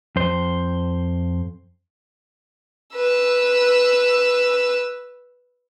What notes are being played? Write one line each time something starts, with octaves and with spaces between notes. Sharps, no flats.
F2 C5
B4 E6